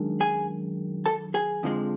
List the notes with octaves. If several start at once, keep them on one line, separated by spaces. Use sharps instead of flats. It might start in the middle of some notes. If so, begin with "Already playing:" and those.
Already playing: F#2 D#3 G#3 D4
G#4 G#5
A4 A5
G#4 G#5
F2 D3 F3 G#3